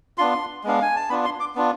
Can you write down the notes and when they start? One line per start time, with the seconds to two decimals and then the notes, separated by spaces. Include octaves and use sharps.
0.18 B3 D4 F4 C6
0.64 G#3 B3 D4 F5
0.82 G#5
0.96 A5
1.09 B3 D4 F4 B5
1.25 C6
1.40 D6
1.55 B3 D4 F4